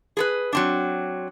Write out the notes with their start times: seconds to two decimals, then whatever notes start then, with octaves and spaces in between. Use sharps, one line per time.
0.17 G#4 A4 B4
0.53 F#3 C4 D4